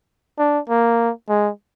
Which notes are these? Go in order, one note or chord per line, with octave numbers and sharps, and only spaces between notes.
D4
A#3
G#3